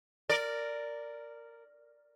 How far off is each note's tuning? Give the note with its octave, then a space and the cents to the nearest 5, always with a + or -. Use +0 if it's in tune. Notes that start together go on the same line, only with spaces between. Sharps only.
A#4 -10 D5 +0